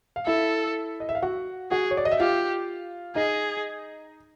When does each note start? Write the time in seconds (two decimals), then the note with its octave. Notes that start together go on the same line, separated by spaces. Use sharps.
0.16 F5
0.26 E4 A4 E5
1.00 D#5
1.09 E5
1.15 F5
1.22 F#4 F#5
1.71 F#4 G#4 F#5
1.91 C#5
1.97 D5
2.05 D#5
2.12 E5
2.19 F4 G4 F5
3.15 D#4 G#4 D#5